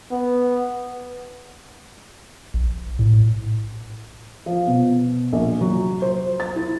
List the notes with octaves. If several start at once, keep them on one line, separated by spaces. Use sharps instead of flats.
B3
A#1
A2
F3
B2
A#1
F#3
C5
A6
E4